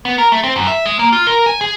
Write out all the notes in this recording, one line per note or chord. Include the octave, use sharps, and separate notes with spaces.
B3
A#4
A3
C4
F#2
E5
G#3
A#3
F4
A#4
G#5
G#4